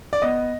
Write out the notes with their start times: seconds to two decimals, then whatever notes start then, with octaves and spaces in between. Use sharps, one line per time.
0.13 D5
0.22 B3 D#5